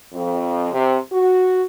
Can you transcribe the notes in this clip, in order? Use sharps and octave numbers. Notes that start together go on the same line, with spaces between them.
F2
C3
F#4